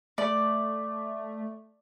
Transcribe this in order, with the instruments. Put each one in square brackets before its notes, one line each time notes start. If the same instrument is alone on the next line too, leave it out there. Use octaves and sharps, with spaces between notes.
[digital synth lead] A3 [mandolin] D5